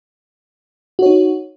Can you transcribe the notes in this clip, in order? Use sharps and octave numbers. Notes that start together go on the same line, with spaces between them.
D#4 F#4 C#5